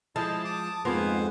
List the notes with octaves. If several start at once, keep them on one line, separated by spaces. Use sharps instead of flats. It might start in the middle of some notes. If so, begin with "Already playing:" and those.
F3 G#3 E4 D#5 A5
D6 D#6
F2 G#2 A#3 B3 F4 G#4 B4 C5